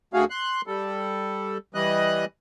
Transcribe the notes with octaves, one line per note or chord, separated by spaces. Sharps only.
D2 A3 F#4 G#4 F5
C6 F#6
G3 A4
E3 G3 D#5 F#6